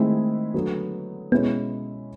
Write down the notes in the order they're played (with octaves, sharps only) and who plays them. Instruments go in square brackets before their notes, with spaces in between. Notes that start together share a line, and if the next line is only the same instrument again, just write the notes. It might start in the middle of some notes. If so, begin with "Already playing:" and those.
Already playing: [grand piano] D#3 G#3 C4 E4 [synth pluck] A3
[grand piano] D3 F#3 B3
[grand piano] B2 G#3 C#4 E4 [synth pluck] B3